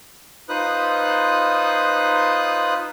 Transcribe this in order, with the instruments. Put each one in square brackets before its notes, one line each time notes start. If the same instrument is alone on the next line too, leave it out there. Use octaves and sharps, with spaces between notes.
[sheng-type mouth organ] D#4 F4 B4 C5 D#6 F#6